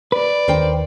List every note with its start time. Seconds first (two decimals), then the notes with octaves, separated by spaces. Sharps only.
0.12 B4 D5
0.48 D#2 D#3 D4 A#4 C5 G5